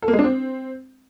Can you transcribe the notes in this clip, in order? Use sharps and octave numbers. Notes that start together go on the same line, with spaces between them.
A4
A#3
G#3
D4
C4